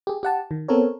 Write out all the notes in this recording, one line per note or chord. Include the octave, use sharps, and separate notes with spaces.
G4 G#4
G4 F#5 A5
D#3
B3 C4 A4 A#4 C#5